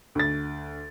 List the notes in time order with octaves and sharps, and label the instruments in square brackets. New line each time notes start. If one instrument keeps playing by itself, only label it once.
[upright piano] D2 A6